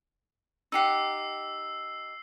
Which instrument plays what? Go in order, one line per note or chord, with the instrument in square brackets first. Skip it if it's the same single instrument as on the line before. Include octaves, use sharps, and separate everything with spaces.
[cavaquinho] D#4 G4 F#5 [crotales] E6 C7